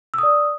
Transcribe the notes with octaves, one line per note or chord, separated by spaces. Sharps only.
D5 D#6 E6